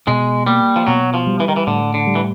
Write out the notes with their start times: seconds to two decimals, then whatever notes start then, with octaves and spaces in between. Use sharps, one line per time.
0.07 B2 G#3
0.47 G3 A#3
0.76 F3
0.87 B2 F#3
1.14 F3
1.27 G3
1.40 E3
1.48 D#3
1.56 E3
1.67 A2 D3
1.94 D3
2.07 G3
2.15 E3